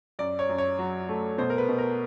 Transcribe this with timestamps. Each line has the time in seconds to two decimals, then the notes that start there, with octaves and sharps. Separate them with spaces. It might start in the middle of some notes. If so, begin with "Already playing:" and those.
0.19 F#2 D5
0.39 C#5
0.49 F#2
0.58 C#5
0.79 F#3
1.09 A3
1.38 B2 C5
1.50 A#4
1.58 B4
1.68 B2
1.78 A#4